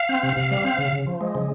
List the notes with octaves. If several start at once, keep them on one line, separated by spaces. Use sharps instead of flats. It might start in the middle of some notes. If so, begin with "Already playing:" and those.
Already playing: F5
C4
C3
C3
G3
C4
C#3
C#3
F3
G#3
C#3